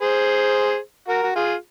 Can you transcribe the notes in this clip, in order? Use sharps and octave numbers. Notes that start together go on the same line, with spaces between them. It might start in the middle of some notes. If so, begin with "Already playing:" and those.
G#4 C5
F#4 A#4
F#4
F4 G#4